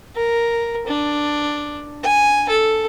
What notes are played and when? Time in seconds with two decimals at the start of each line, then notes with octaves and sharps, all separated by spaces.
0.15 A#4
0.87 D4
2.03 G#5
2.49 A4